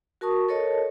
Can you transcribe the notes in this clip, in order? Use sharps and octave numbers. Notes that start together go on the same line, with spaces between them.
F#4 A#4 A5 C#6 D#6
A4 A#4 C#5 D#5 A5